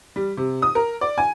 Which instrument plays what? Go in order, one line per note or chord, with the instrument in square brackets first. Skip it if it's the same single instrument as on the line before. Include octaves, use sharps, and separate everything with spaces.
[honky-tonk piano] G3
C3
D#6
A#4
D5
G#5